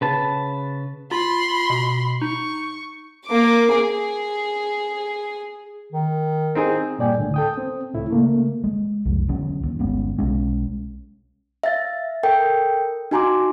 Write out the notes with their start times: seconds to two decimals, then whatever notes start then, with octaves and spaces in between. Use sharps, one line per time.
0.01 C#3 B4 A5
1.11 F4 B5 C6
1.70 B2
2.22 D#4 C#6
3.26 A#3 D6
3.73 G#4
5.92 D#3
6.55 C4 D#4 G#4
6.98 G2 A#2 D5 G5 G#5
7.16 D2 A2 D3
7.34 A4 G5 D#6
7.57 C4
7.94 C#2 A2 A3 E4
8.08 C#3 A3 A#3
8.64 G#3
9.05 C2 F2
9.28 E2 D3 F#3 C#4
9.63 D#2
9.79 G1 G#3 B3 C#4
10.18 B1 G#3 C#4
11.64 E5 F5 A6
12.23 A4 A#4 G5
13.11 D#4 F#4 G#5 A#5 C6 D6